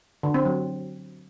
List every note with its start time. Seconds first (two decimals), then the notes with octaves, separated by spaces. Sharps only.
0.23 D3
0.34 C4
0.45 F#3